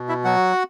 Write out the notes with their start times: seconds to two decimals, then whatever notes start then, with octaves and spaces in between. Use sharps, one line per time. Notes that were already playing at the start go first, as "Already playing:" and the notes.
Already playing: B2
0.09 E4 E5
0.24 F#3 F#4 F#5